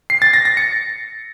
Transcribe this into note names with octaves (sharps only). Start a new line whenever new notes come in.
C7
A6
A#6
A#6
C#7